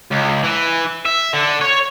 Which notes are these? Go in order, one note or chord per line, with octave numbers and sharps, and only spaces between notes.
C#2
E3
E5
D3
C#5